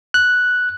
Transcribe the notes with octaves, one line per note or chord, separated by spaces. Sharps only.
F#6